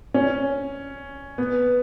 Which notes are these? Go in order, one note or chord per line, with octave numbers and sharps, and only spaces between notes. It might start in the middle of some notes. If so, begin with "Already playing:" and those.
C#4
B3